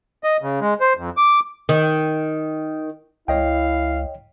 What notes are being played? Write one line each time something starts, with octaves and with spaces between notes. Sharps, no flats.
D#5
C#3
G#3
C5
F2
D6
D#3
C#2 E4 C#5 D#5 F5 G5